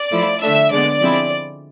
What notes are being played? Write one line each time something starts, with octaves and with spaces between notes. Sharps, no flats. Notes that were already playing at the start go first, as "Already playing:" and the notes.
Already playing: D5
F3 A3 E4
D3 A3 D4 E5
D3 G#3 B3 D5
F3 G#3 C4 E4